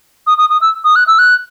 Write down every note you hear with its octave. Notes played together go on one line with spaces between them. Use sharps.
D#6
D#6
D#6
E6
D#6
F#6
E6
F#6